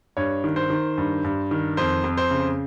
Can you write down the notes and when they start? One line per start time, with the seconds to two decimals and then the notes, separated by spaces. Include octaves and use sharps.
0.17 G2 C#5
0.44 D#3
0.56 C5
0.70 D#3
0.98 G2
1.24 G2
1.51 D#3
1.77 F2 C5
2.04 F2
2.17 C5
2.31 C#3